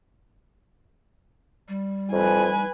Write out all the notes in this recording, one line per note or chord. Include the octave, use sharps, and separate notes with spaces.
G3
F2 B4 G#5